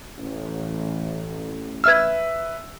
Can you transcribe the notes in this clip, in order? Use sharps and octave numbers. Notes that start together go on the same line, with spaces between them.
A1
B4 E5 E6 F6 G#6